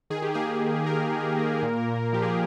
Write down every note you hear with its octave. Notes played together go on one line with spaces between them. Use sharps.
D#3 G#4
G4
A#3 G#4
A#3
D#3 A#4
D#3
A#3
A#2
A#2
F3 G4
G#4
A#4